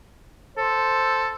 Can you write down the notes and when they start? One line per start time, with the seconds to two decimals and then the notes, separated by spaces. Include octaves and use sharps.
0.57 A4 C5